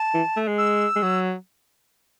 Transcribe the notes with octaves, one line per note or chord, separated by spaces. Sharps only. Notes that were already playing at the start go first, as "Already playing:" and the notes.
Already playing: A5
E3
A3
G#3
E6
G#3
F#3